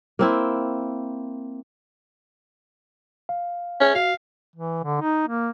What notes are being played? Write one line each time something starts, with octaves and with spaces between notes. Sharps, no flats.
A#3 C4 E4
F5
C#4 G#4 C#5 E5
F#4 F5
E3
D3
D#4
A#3